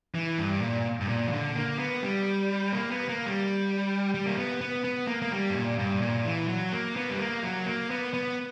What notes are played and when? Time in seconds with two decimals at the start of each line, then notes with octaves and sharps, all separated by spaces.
0.15 E3
0.38 G2
0.62 A#2
1.00 G2
1.09 A#2
1.28 E3
1.32 D3
1.55 A#3
1.79 B3
2.03 G3
2.73 A#3
2.91 B3
3.09 A#3
3.26 G3
4.14 G3
4.26 A#3
4.38 B3
4.61 B3
4.84 B3
5.08 A#3
5.22 A#3
5.32 G3
5.50 G2
5.55 A#2
5.79 G2
6.02 A#2
6.26 E3
6.48 F#3
6.73 A#3
6.96 B3
7.10 G3
7.19 A#3
7.43 F#3
7.66 A#3
7.90 B3
8.14 B3